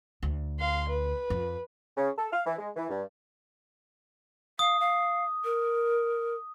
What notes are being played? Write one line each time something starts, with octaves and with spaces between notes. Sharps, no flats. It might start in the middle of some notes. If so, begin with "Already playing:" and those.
D2
F5 C6
B4
F2
C#3
A4
F5
E3
G#3
E3
G2
F5 D#6
F5
A#4